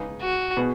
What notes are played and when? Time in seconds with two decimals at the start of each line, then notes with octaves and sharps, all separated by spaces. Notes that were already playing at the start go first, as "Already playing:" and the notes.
Already playing: C#3 G#3 D#4 B4
0.21 F#4
0.57 B2 B3 G#4 B4